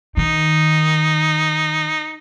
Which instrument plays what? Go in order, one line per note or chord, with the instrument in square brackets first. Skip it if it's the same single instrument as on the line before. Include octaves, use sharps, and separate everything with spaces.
[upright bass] D#3 [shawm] D#4